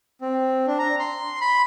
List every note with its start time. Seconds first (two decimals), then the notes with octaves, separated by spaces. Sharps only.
0.21 C4
0.67 D4
0.78 A#5
1.00 C6
1.41 B5